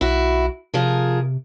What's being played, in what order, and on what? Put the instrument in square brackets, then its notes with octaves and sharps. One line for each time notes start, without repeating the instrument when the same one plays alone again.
[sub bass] B1 [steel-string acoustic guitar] E4 F#4
[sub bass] C3 [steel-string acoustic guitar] F3 G#4 A#4